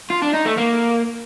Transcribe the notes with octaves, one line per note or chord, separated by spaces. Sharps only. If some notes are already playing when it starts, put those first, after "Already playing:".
F4
D4
D#4
A3
A#3